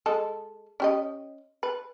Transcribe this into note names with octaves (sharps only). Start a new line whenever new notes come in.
G#3 A4
C#4 G4 D#5
B4